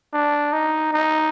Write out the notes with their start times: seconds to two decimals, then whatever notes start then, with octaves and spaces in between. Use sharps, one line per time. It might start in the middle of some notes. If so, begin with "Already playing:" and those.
0.14 D4
0.53 D#4
0.94 D#4